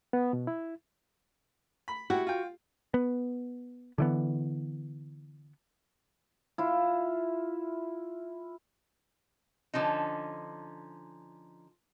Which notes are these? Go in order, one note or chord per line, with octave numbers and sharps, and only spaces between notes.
B3
B2
E4
B5
E4 F#4 G4 F#5
F4 G5
B3
D3 E3 B3
E4 F4
D3 F3 C#4 D#4